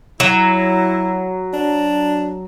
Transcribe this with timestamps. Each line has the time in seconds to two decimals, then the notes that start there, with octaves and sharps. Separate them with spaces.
0.20 F#3 E4
1.54 D4